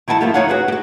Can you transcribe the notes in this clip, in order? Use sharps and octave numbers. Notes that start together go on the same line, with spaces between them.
D#3 E4 F#5 G#5 A5
F3 A3 A#3 F4 G4
D2 E3 D#4 C#5 F5 F#5
F#4 G#4 B4
F#4 G4